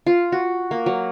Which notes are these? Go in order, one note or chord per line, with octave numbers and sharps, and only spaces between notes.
F4
F#4
A#3
F#3